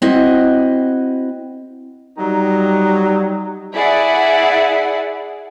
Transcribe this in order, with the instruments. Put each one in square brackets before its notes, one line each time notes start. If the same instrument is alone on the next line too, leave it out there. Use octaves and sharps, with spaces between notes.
[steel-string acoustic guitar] C4 E4 F#4 D#5 F#5
[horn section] F#3 G3 D#4
[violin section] E4 G#4 D5 E5 F#5